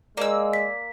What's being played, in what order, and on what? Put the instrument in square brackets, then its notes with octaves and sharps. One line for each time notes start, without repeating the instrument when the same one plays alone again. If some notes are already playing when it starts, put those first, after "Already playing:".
[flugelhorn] G#3 [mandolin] A#3 E6 [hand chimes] D5
[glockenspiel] B6